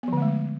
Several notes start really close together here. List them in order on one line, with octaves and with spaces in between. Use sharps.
B3 F3 D3 A3 G#3